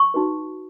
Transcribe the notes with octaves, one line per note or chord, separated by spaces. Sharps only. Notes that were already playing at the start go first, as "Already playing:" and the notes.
Already playing: C#6
D#4 F#4 B4